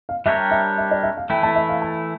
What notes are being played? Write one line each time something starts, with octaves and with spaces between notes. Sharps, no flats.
F5
G3 D4 G4 A#4 C#5 E5
E5
E5
D5
E5
F5
E3 A3 E4 G5
A5
E5
F5
A5